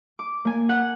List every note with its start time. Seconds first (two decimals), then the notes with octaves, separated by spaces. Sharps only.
0.19 D6
0.45 A#3 G#5
0.69 F#5